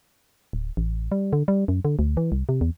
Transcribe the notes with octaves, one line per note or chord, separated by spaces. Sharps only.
D1
A1
G3
D3
G3
F#2
D3
D2
E3
C2
C3
E2